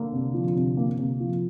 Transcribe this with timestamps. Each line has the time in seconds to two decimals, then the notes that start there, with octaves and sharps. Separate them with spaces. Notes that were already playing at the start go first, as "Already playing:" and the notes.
Already playing: D3 A#3
0.13 C3
0.34 F3
0.56 C3
0.77 A#3
0.98 C3
1.20 F3